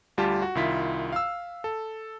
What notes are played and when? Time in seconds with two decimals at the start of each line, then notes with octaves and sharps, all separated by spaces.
0.18 D2 G3 F4 G4 A5
0.42 F#4
0.55 C2 D#3 E4 F4 B6
1.12 F5 E6
1.64 A4